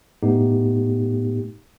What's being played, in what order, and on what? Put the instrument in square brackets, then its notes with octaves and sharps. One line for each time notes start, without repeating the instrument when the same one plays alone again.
[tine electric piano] A2 A3 B3 D#4 G4